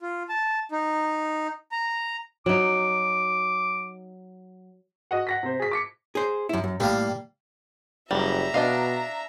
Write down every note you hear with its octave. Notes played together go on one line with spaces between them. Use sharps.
F4
A5
D#4
A#5
F#3 D#4 D6
F#4 D#5 F#5
F#5 A#6 B6
C3 C5
G#4 B6
D6 B6 C#7
G#4 C5
F#2 E4
F#2
A2 G3 A#3 F5
F#1 G3 E5 A#5
B2 D4 D#5 F5